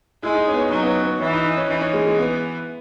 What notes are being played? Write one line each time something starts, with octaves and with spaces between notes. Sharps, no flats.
G#3 E4
D#4
C#4
B3
C#4
F#3 D#4
B3
C#4
B3
E3 C#4
D#4
D#4
C#4
E3 D#4
C#4
G#3
G#3
B3